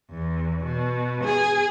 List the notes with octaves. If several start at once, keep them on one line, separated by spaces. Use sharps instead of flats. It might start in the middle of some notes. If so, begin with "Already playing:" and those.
E2
B2
G#4